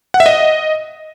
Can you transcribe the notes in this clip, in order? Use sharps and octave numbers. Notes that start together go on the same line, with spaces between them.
F#5
E5
D#5